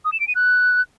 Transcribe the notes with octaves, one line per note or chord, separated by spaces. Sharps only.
D#6
E7
D7
D#7
F#6